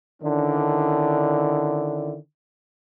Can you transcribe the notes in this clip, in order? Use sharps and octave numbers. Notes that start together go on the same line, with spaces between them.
D3 D#3 C#4 D4 E4